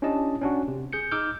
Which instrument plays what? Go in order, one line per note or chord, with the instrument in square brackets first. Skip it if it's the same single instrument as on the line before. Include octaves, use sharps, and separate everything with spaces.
[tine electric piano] C#4 D4 E4 G4 D#5 A5
C#4 D4 F#4
C3
G#4 G6 C#7
D#4 D6 E6 F6 G6